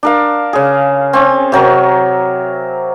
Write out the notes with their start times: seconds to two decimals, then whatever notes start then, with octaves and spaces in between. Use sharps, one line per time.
0.03 D4 A#4 F5
0.53 C#3 G#4
1.13 C4 C#4
1.52 C3 F#3 A#4 C#6